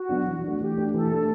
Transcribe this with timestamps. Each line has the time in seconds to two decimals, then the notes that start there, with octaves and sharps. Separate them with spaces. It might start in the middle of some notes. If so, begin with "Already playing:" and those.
Already playing: F#4
0.09 F#3 B3 D4
0.26 E3
0.44 A3 D4
0.60 E3 G4
0.78 A3 D4
0.94 E3 A4
1.12 A3 D4